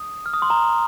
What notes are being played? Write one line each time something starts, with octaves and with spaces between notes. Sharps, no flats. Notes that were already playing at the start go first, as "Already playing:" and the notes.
Already playing: D#6
F6
D#6
C6
A#5